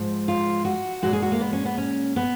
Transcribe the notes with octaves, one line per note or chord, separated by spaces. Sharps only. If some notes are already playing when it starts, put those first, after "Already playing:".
Already playing: G#2 F3 G#3
F4
F#4
A#2 G#3 F#4
G#4
F#4
A#3
B3
C#4
B3
C#4
B3